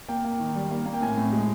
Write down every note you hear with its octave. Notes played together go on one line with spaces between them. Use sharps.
A#3 G5
A#3
D#3
G3
A#3
A#3
G5
A2 G#5
A2
G#3